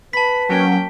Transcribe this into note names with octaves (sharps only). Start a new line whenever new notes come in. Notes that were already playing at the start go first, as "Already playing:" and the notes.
B4 A5 B5 B6
F#3 A#3 C#4 G5